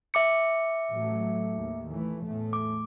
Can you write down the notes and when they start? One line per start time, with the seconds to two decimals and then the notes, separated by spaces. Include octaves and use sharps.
0.14 E5 D6 C#7
0.90 A1 F#3 A3
1.54 D#2
1.90 E3 A3
2.22 E2 A2 A3
2.53 D6